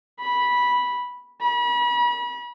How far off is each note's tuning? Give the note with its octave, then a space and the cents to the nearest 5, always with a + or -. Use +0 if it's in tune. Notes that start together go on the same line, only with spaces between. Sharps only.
B5 -10
B5 -40